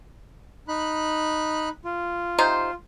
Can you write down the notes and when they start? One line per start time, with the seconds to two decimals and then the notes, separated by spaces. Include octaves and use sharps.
0.68 D#4 B5 F#6
1.85 F4
2.38 C3 D#4 C5